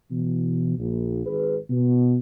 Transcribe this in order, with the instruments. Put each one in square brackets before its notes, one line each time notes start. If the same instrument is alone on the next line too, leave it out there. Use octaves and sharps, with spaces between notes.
[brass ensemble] B2 E3
A#1
G#1 G#4 B4
B2